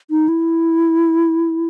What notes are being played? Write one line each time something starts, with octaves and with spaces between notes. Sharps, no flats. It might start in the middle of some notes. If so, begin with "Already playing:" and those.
D#4
E4